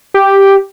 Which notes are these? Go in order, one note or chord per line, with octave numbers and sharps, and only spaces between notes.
G4